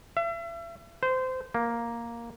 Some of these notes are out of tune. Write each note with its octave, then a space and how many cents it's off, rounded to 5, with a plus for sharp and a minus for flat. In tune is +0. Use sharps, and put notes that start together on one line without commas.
E5 +40
C5 -20
A#3 +5